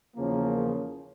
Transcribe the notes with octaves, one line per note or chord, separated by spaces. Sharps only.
E2 C#3 F3 A#3